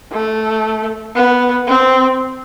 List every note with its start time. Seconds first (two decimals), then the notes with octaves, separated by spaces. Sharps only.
0.12 A3
1.15 B3
1.67 C4